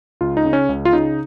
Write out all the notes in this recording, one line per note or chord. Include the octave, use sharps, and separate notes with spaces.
C#2 F4
D#4
C#3
C#4
C#2
F4
C#3 D#4